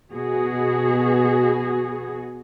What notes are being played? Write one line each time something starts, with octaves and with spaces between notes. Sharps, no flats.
B2 B3 F#4 G#4